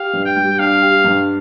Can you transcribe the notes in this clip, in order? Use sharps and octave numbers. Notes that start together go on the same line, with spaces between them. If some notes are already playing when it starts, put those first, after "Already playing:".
Already playing: G4 F5
G2
G5
G3
D4 F5
G4
G2